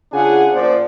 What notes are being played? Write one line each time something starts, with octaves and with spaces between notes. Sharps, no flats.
C#3 D4 F4 G#4 F#5 G#5
A#2 F3 C5 D5